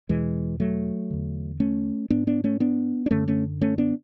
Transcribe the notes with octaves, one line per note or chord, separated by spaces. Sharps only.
E2 B2 E3 G#3
F#3 A3
E2 D3
A3 C#4
G#2 B3 D4
B3 D4
A3 C#4
B3 D4
D4
F#2 D3 A3 C#4
A3 C#4
A3 C#4
B3 D4